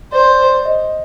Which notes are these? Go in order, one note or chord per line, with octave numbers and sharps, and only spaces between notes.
C5 D5
D#5